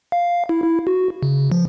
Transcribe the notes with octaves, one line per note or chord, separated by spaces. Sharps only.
F5
E4
E4
F#4
C#3
F3